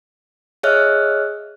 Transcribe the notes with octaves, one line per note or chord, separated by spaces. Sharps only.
G#4 C#5 D#5 E5 F6 F#6